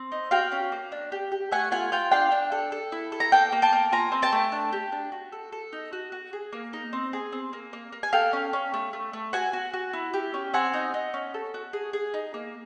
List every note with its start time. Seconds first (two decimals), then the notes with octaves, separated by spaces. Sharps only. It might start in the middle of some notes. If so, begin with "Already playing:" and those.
Already playing: C4
0.12 D#4
0.31 F#4 F5 G5
0.52 C#4
0.72 A#3
0.92 D4
1.12 G4
1.32 G4
1.52 A3 F#5 G#5
1.72 F4 F#5 G#5
1.92 F4 F5 G5
2.11 D4 F5 G5
2.32 D4
2.52 A4
2.72 A4
2.92 E4
3.12 A4
3.20 A#5
3.32 A#3 G5 A5
3.52 A#3
3.62 G5 A5
3.73 A#3
3.92 F4 G#5 A#5
4.12 C4
4.22 G5 A5
4.32 A3
4.52 D4
4.73 G4
4.92 D4
5.12 F#4
5.32 A4
5.52 A4
5.73 D#4
5.93 F#4
6.12 F#4
6.33 G#4
6.53 A#3
6.73 D#4
6.93 C4
7.13 G#4
7.32 C4
7.53 A#3
7.73 A#3
7.92 A#3
8.03 G#5
8.13 A4 F5 G5
8.33 C#4
8.53 C#4
8.74 A3
8.93 A3
9.13 A3
9.33 F#4 F#5 G#5
9.53 F#4
9.74 F#4
9.93 E4
10.14 G4
10.34 C#4
10.54 C4 F#5 G#5
10.74 D#4
10.94 D#4
11.14 C#4
11.34 A4
11.54 F#4
11.73 G#4
11.93 G#4
12.14 D#4
12.34 A#3